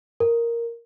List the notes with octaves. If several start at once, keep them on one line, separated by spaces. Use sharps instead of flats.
A#4